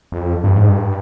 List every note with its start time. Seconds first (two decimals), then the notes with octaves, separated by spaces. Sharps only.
0.12 F2
0.44 G2
0.56 G#2
0.69 G2